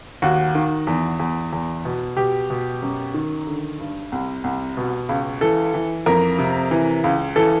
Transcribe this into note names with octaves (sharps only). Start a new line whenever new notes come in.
D#2 F#4
D#3
E2
E2
E2
B2
B2 G4
B2
F#2
D#3
D3
G2
C2
C2
B2
C#2
E3 A4
E3
F2 A#4
C3
E3
C#2
E3 A4